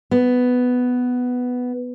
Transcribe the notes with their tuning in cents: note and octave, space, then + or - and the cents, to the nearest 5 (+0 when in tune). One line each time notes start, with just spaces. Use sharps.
B3 +5